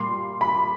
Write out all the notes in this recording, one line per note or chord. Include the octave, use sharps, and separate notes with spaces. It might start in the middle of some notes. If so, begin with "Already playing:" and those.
Already playing: A#2 G3 A#3 C6
B5